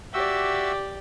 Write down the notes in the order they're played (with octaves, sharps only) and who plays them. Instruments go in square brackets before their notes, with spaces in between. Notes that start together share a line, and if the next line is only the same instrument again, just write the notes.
[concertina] F#4 E5 E6 [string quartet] G4 D5